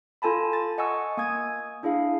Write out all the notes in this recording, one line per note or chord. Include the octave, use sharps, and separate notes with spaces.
F4 A4 G#5 A5 B5
A6
D#5 F#5 G#5 C#6 E6
A#3 G#5 D#6 G#6
D4 E4 G#4 F5